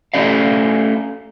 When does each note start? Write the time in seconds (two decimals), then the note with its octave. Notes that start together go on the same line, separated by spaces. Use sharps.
0.14 A3 C#4 D5 F5